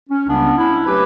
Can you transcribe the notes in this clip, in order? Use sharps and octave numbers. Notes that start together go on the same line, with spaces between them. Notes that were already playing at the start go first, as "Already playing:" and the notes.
C#4
C#2 C#3 G3 B3 D4
C#4 E4
F#3 A3 G4 B4